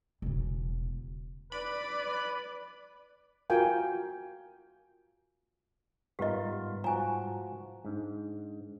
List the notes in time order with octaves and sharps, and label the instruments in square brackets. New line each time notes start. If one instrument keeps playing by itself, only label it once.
[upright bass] E1 C#3
[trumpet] B4 [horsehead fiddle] D5 [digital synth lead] B5
[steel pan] F4 F#4 A#4 F5 G5 G#5
[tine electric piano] G#2 G3 G#3 [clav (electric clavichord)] B3 F4 A#4 [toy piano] G4 D#5
[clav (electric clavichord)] F3 F#4 [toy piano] G#5 A#5
[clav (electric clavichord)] G#2 [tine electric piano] D4